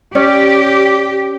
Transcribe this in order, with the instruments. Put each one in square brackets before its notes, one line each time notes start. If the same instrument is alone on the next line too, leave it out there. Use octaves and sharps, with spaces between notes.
[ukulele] C#4 D5 [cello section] G4